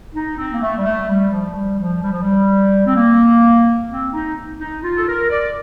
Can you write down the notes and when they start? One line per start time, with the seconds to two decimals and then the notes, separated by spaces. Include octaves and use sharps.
0.14 D#4
0.38 C4
0.52 A#3
0.62 A3
0.78 G3
0.85 A3
1.09 G3
1.32 F3
1.55 G3
1.79 F3
2.03 G3
2.12 F3
2.22 G3
2.87 C4
2.96 A#3
3.89 C4
4.13 D#4
4.60 D#4
4.83 F4
4.96 A4
5.08 A#4
5.30 D5